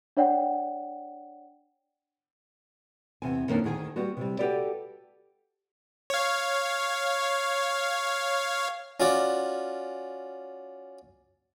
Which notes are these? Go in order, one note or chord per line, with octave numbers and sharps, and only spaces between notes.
D4 C#5 D5 F#5 G5
E2 C3 G#5
F2 D#3 A#3 C#4 D4
D2 D#3 G#4 G5 G#5
G3 B3 F#4
C3 G3
F#4 G4 A4 B4 D5
C#5 F5
C#4 F4 F#4 D5